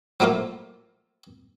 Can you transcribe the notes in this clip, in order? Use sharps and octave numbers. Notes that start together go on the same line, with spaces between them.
F3 F#3 A3 A#3 F4